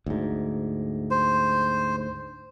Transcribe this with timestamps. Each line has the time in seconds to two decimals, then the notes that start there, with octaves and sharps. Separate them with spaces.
0.06 D2 G#2
1.11 C5